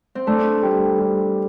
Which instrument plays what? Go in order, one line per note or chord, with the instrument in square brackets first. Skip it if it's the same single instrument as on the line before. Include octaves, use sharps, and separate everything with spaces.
[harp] C4
[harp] A3 [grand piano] D4
[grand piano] G3
G3